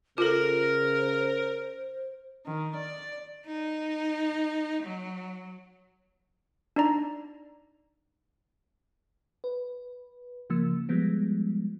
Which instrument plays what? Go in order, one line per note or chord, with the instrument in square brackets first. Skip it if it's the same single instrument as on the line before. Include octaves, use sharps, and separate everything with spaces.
[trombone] C#3 [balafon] F4 A4 [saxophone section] A#4 [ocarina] C5
[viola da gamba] D#3
D5
[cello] D#4
F#3
[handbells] D4 D#4 D5 A#5
[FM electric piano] B4
C#3 F3 A#3 E6
F3 G3 G#3 B3